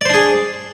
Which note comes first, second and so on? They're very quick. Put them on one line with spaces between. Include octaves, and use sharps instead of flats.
D5 C5 D4 G#4